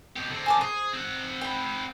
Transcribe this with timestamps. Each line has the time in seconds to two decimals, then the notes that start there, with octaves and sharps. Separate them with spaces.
0.16 B2 G4
0.30 D3 C4
0.46 G#5 A5 D6
0.61 G#4 C5
0.93 C4 F#5
1.41 G5 B5